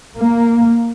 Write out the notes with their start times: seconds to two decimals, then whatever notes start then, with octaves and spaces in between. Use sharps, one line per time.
0.18 A#3